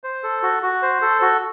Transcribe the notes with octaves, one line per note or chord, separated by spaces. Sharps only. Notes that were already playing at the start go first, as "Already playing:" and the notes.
C5
A4
F#4
F#4
C5
A4
F#4